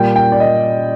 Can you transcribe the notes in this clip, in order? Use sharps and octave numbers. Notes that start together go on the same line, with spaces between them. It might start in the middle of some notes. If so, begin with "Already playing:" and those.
Already playing: A#2 G3 A#3 G5
G5
D5
D#5